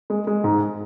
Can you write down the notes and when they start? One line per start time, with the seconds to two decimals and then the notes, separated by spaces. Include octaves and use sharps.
0.10 G#3
0.27 G#3
0.44 G#2